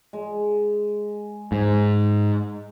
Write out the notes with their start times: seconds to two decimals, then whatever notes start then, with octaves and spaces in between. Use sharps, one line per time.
0.13 G#3
1.52 G#2